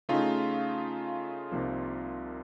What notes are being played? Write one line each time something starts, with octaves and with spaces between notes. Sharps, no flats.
C#3 A3 D#4 F4
C2 C3 F3 A#3 D#4